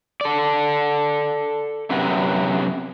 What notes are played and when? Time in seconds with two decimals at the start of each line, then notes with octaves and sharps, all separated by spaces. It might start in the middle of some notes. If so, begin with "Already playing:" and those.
0.21 A4 D5
1.90 F#2 C3 B3